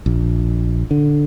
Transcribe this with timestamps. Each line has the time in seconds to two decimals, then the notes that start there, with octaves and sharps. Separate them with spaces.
0.06 A#1
0.91 D3